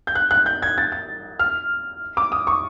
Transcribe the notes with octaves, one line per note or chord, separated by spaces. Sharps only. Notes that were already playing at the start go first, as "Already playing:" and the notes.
G6
F#6
F#6
G6
G#6
A6
A6
F6
D6
D#6
C#6